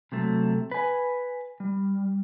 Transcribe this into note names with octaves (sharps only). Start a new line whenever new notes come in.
C3 F#3 A3
B4 G#5
G3